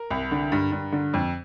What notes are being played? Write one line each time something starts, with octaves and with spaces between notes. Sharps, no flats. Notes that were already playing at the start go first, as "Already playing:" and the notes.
Already playing: A#4
C2
D3
G2
G2
D3
F2